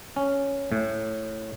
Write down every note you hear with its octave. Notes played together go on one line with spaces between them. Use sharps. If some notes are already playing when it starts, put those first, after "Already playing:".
C#4
A2